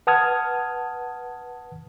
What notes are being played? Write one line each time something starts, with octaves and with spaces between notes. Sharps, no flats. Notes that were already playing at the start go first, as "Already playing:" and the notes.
B4 F#5 A5 D#6 F6 G#6